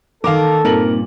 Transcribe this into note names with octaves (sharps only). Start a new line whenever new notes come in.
D#3 A#3 A4 A#4 F5 D6
G2 A#2 A#3 C4 D#4 A#4 F#7